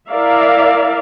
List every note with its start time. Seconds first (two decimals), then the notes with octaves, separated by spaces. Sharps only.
0.10 E4 A#4 D5 E5 F5